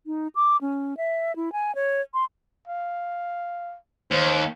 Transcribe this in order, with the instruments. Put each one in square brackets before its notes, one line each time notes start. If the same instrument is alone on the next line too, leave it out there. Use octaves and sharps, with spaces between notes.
[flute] D#4
D6
C#4
E5
E4
G#5
C#5
C6
[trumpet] F5
[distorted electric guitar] D#2 [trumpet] C5